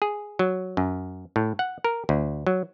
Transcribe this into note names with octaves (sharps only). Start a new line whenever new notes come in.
G#4
F#3
F#2
A2
F#5
A#4
D2
F#3